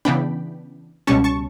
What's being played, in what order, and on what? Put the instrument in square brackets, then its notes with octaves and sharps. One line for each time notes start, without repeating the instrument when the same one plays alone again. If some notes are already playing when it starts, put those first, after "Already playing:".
[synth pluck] C#3 E3 B3 D4 G5 B5
C#2 B2 G3 C#4 A5 C#6
A5 C#6